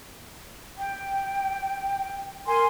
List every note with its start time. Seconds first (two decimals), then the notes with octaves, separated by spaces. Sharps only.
0.78 G5
2.47 A#4 G#5 C6